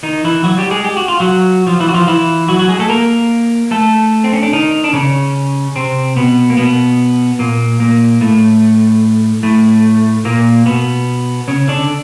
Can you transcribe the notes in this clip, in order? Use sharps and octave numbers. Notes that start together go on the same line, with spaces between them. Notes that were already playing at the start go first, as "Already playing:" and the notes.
D#3 D#4
E3 E4
F#3 F#4
G3 G4
G#3 G#4
G4
F#4
F4
F#3 F#4
F3 F4
E3 E4
F#4
F3 F4
E3 E4
F#3 F#4
F#3 F#4
G#3 G#4
A3 A4
A#3 A#4
A3 A4
C4
C#4
D4
D#3 D#4
D4
C#3 C#4
C3 C4
B2 B3
A#3
B2 B3
A#2 A#3
A#2 A#3
A2 A3
A2 A3
A#2 A#3
B2 B3
C#3 C#4
D3 D4